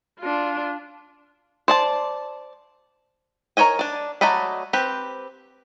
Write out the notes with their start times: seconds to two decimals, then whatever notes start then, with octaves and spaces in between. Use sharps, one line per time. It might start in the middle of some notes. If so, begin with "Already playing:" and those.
0.20 D4 F4
1.68 C5 D5 A5
3.57 A#4 C5 C#5 D#5 G#5
3.79 D4 D5
4.21 F#3 A3 D5 D#5 B5
4.73 C4 G4 B4